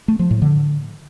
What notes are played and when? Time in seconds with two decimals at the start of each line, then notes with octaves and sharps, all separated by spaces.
0.08 A3
0.19 F3
0.31 A2
0.42 D3